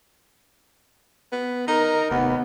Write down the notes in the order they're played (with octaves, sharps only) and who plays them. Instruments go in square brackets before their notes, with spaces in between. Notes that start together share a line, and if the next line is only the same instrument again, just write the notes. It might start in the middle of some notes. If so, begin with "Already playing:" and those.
[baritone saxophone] B3
[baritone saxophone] D#4 [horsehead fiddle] A#4
[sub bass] F1 [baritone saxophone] D#2 [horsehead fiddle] B3